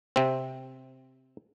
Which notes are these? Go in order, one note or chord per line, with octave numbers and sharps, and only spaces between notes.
C3 C4